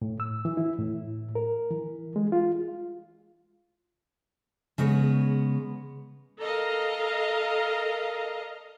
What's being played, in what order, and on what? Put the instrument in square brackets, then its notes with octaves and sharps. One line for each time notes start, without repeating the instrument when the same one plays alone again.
[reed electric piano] A2
E6
E3
E4
A2
A#4
E3
G#3
F4
[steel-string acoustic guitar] C#3 G#3 B3 C#5
[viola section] A4 A#4 D#5 F5 A#5